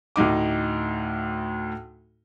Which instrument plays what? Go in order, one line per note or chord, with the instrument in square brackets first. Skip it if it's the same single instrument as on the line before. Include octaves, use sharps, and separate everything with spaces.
[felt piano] D2 A2 D#4 D6